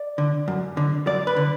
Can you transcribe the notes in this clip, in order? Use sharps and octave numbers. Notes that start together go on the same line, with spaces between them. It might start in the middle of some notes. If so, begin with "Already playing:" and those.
Already playing: D5
D3
F#2
D3
F#2 D5
B4
D3